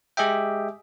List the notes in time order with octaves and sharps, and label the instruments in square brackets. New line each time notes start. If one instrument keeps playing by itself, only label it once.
[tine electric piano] G#3 G4 G#4 D#5 E5 G5